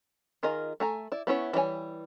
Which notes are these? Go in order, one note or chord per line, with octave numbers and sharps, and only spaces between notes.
D#3 F4 G#4 A#4 D#5
A3 G#5 A#5
E4 D5
B3 C#4 E4 C#5
E3 G3 E4 C#5 G#5